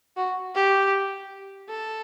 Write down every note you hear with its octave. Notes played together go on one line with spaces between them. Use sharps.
F#4
G4
A4